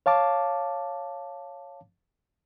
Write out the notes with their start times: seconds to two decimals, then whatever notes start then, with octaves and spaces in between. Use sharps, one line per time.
0.06 C#5 F5 A5 D6